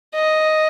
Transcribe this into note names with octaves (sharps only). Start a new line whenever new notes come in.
D#5